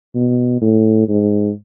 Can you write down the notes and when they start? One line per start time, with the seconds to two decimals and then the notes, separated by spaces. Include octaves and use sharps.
0.15 B2
0.61 A2
1.08 G#2